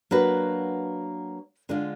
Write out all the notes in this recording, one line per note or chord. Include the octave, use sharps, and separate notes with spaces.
F#3 A#3 D4 F#4 B4
D3 G#3 D4 F4